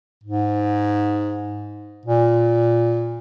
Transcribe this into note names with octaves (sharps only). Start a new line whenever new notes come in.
G#2
A#2